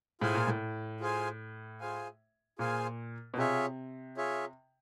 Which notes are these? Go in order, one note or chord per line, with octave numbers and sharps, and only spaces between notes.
A2 F4 G#4 C5 F5 G#5
A#2
A2
F4 G#4 C5 F5 G#5
F4 G#4 C5 F5 G#5
A#2 F4 G#4 C5 F5 G#5
B2
C3 F4 G#4 C#5 E5
F4 G#4 C#5 E5